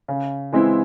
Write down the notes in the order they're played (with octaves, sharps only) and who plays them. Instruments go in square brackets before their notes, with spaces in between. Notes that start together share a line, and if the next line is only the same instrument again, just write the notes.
[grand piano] C#3
E3 G#3 C4 E4